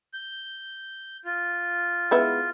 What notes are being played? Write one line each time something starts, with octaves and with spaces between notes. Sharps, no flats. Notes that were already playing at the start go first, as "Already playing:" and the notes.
G6
F4
G#3 B3 E4